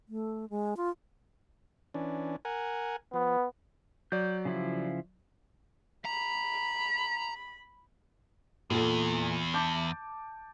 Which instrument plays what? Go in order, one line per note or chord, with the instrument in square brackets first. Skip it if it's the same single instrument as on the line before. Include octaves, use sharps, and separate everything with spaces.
[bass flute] A3
G#3
F4
[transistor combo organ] E3 C#4 D4
A#4 F#5 G#5
[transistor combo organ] F3 [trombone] B3
[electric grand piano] F#3 D5 [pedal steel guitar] G6
[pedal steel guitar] C#3 F3 E4
[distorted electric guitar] A#5 [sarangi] B5
[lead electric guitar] E2 [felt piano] A#2 A4
[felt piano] A5 D6 G6